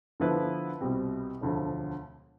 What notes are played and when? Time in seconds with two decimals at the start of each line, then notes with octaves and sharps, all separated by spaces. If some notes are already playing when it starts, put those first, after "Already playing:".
0.20 D3 F3 B3 E4 B4
0.81 C2 B2 G3 C4
1.41 E1 D2 D3 F3